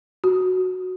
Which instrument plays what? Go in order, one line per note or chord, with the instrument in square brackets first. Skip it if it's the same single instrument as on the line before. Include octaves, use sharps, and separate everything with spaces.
[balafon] F#4